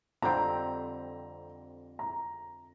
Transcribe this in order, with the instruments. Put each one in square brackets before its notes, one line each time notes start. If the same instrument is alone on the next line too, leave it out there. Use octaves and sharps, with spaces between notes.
[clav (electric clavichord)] F2 D3 G3 C4 G4 [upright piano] A#5
[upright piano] A#5